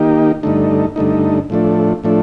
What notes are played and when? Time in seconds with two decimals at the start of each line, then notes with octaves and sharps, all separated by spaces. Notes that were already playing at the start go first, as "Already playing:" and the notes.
Already playing: D#3 A#3 D#4 G4
0.43 G2 D3 A3 D#4
0.96 G2 D3 A3 D#4
1.50 A2 F3 A3 D4
2.04 A2 F3 A3 D4